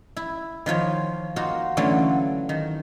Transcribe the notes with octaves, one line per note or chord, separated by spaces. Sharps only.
E4
D#3 F3 F4 C#5
A#3 D#4 F4 F#4 A#4
D3 E3 F#3 A3 C#4 F4
D#3